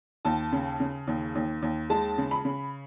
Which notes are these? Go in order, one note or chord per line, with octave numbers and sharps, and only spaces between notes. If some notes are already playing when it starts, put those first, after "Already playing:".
D#2 A5
C#3
C#3
D#2
D#2
D#2
G#3 A5
C#3
B5
C#3